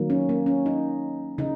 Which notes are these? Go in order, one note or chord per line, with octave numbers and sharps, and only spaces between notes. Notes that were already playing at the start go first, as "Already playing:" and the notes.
Already playing: D#3 F#3 A#3
C#4
A#3
C#4
D#4
C#3 D#4